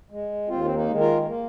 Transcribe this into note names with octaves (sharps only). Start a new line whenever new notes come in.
G#3
D#2 C4 F4
C4
A#3 D#4
D#3 G#3
F4 A#4
A#3